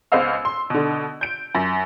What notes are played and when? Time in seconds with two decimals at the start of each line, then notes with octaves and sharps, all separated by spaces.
0.12 C#2 B3 C5 D#5 F5 E6
0.45 C6
0.70 B2 D3
1.21 G6 D7
1.55 F#2